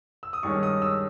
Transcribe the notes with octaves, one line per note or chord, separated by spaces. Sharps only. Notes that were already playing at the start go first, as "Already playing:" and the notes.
E6
D#6
G2 D#3 G#3 C#4 C#6
D#6
E6